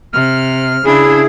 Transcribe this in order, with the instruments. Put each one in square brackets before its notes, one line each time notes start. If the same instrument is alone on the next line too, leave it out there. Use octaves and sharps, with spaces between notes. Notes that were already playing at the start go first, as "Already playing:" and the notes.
[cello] C3 [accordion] F6
[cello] C#3 D4 [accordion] E4 G#4